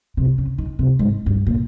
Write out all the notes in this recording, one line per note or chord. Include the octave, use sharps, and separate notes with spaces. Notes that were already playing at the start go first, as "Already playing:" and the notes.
C3
C#3
D#3
C3
G#2
G2
A#2